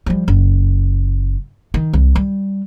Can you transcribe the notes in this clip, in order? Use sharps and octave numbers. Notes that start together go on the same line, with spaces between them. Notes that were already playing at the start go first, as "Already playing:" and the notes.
F3 G3
F#1
D#3
C2
G3